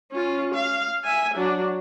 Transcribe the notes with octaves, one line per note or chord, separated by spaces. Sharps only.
C#4 F4
F5
E5 G#5
F#3 D4